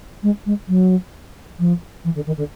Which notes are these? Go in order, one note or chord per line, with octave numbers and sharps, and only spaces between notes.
G#3
G#3
F#3
F3
E3
D3
D#3
D3